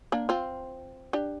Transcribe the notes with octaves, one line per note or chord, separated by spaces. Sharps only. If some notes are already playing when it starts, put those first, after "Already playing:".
A#3 D4
C4 F4
D4 G4